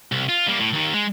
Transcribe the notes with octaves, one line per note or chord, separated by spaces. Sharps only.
C2
F4
G3 A#3
A2
D#2 D#3
G#3